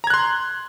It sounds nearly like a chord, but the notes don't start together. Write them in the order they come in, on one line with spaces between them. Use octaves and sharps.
A#5 G#6 F#6 C6